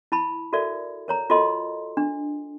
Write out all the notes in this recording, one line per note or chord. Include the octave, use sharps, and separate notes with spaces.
E4 A5 B5
F#4 A4 A#4 D5 E5
A#4 C#5 A#5
F4 F#4 A4 D#5 C6
D4